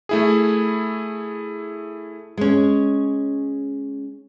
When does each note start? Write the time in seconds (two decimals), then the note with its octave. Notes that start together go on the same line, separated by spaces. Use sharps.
0.09 A3 E4 G#4
2.37 G#3 C#4